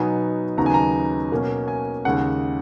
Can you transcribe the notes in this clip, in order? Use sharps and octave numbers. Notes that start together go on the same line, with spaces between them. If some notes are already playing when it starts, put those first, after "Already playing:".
Already playing: B2 F#3 B3 D#4 G#5
D#2 C#3 F#3 B3 D#4 A#5
G#5
A#5
B2 A#3 C#4
G#5
D#2 C#3 G#3 F#5